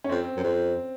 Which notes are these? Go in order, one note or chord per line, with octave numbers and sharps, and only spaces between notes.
C#4
F2 C4
F#2
F2